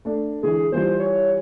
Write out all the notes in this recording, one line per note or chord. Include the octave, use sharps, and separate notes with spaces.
A3 D4
D3 E3 G#3 G#4
E3 F3 G3 C5
C#5